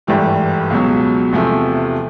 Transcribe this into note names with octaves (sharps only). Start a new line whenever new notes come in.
G#1 G2 E3 A3 G4
C#2 B2 F#3
E2 C3 F3 A3